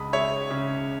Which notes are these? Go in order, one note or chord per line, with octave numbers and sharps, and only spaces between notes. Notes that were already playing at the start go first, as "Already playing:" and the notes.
Already playing: C#2 G#3 B5 D#6
G#3 C#5 E5
C#3